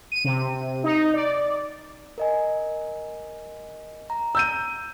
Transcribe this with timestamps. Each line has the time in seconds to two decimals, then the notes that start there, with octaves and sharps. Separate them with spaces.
0.12 D#7
0.24 C3
0.84 D#4
1.14 D5
2.18 A#4 D#5 G#5
4.10 A#5
4.35 E6 G6 D#7